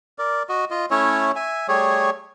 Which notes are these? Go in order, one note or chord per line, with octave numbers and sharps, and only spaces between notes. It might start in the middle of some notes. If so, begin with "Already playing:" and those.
A#4 D5
F#4 D#5
F4 D#5
A3 C#4 E4 C#5
E5 G#5
G3 A3 G#4 C#5